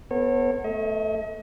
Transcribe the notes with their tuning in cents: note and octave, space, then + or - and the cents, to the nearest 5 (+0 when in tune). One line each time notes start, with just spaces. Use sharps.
B3 +0 A4 +40 C#5 -30
A3 +0 D#5 +40